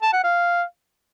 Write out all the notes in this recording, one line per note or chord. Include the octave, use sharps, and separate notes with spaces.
A5
F#5
F5